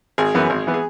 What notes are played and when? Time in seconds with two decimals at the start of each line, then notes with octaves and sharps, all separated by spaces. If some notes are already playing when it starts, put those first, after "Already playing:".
0.18 G#1 G#4
0.34 F#2 E3 B3
0.50 G#1
0.67 E3 B3
0.74 G#4